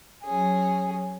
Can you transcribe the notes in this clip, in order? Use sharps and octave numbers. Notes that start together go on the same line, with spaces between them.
F#3 C#4 G#4